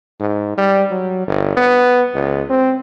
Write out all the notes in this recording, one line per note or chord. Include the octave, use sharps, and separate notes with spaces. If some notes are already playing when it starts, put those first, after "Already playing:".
G#2
G3
F#3
G1
B3
C#2
C4